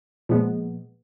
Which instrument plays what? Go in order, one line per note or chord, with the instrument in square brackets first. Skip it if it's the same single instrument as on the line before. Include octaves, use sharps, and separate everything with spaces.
[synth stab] A#2 F3 G#3 B3